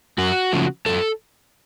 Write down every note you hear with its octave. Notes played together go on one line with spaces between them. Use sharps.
F#2 F#4
C#3 F3 A3
F#2 A4